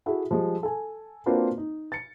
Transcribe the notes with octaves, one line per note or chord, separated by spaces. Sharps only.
E4 F#4 G#4 A4 E5
F3 G3 G#3
A4 G#5
A#3 C4 D4 F4 F#4 B4
D#4
A6 C#7